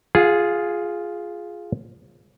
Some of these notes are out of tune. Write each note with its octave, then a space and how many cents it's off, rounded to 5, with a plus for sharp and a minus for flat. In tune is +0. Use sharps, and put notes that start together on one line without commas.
F4 +0 G#4 +0 F#5 -35